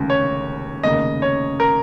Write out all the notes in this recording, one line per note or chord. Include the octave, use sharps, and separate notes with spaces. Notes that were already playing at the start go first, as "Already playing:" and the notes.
Already playing: F1 D#2 C#3 G#3
C#5
F1 D#2 C#3 A#3 D#5
C#5
A#4